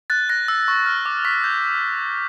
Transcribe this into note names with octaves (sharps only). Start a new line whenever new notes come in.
F#6 A6
F#6 A#6
E6
C#6
F6
D6
C#6 B6
G6